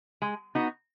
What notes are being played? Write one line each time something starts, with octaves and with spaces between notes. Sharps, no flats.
G#3
B3 D#4 F#4